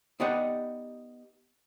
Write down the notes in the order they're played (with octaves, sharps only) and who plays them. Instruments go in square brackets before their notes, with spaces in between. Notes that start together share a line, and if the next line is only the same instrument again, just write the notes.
[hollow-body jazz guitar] B3 D#4 G4 D5 D#5 F#5